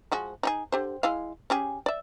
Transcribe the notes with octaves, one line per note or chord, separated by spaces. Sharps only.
F3 G#3 F#4
D#4 G4 G#4
D3 G4 C5
G#3 E4 F5
C#4 G4 G#4
D5 E5